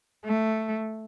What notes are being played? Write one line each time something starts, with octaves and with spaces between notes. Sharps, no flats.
A3